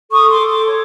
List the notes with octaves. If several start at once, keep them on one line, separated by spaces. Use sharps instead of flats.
A4 C#6 D#6
C6 D6
A4
C6 D6
C#5